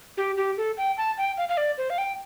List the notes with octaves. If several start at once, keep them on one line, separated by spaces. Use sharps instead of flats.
G4
G4
A4
G5
A5
G5
F5
F5
D5
C5
F5
G5